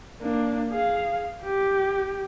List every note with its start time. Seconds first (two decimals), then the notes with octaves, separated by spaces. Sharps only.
0.22 A#3 D4
0.71 G#4 F5
1.44 G4